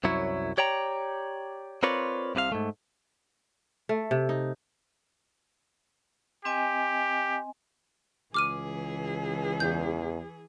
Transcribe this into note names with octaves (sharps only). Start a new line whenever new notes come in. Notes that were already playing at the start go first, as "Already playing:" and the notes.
C2 F#2 F#3 E4 C#5
G4 C#5 D5 G5 A#5
C4 F4 A#4 B4 C#5 D5
C2 C3 B4 F5
G#2 A3
A3
C3
D#4
C4 G4 D#5 G#5
C#2 E3 G#4 D6 F6 D#7
E2 G6